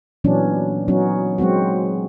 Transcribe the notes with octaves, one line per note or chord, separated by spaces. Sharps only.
A#2 E3 F#3 B3 C#4 D4
F#3 B3 C#4 D#4 F#4
F#3 G#3 C4 F#4